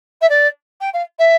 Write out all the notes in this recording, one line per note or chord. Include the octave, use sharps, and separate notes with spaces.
E5
D5
G5
F5
E5